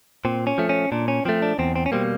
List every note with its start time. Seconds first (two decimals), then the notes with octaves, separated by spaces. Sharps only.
0.25 A#2 C4
0.47 C#4
0.58 F3 A3
0.69 C#4
0.92 A#2 D4
1.08 C#4
1.25 F3 A3 C4
1.42 D4
1.59 E2 C4
1.76 C4
1.86 C#4
1.92 B2 G3 A#3 C4